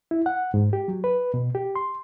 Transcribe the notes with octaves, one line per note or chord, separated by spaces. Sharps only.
E4
F#5
G#2
G4
F#3
B4
B2
G4
C6